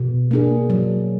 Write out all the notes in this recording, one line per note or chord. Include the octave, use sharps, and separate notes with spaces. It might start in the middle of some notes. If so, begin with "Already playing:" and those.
Already playing: B2
A#3 D4 G#4
F#3